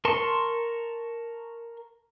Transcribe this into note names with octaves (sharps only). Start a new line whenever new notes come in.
A#4 A5 C6 C#6